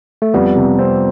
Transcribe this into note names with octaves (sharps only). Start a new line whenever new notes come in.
A3
F2 G3 B3
C3
C4